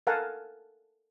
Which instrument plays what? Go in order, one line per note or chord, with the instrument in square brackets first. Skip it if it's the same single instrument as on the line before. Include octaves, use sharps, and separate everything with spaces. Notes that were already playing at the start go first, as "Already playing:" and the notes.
[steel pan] A4 A#4 F5 F#5 G#5 A5